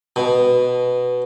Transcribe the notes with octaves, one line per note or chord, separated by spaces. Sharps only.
B2